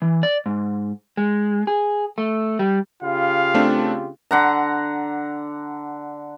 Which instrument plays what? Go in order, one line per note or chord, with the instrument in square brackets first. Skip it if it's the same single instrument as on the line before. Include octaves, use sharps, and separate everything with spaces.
[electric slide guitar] E3
D5
G#2
G#3
G#4
A3
G3
[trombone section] C#3 F4 G4 [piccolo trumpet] F5
[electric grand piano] A3 C4 D4
[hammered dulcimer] D3 F#5 A#5